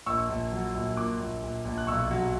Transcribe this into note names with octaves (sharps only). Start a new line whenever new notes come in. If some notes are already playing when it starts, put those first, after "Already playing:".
A#1 C#6 E6
A#1
F#3
A#1
A#2 D6 F#6
A#1
A#1
A#1
F#6
B1 C#6 E6
F#3